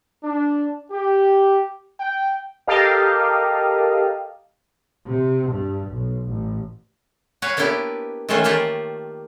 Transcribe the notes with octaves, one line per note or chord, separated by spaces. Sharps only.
D4
G4
G5
G4 A4 A#4 D#5 F5
C3
G2
B1
A1
F#4 B4 C#5 F5 F#5
A#3 B3 D4 E4 G4 B4
D#3 E3 A3 C#4 F4 F#4
D#3 A3 A#3 F4 G4 D5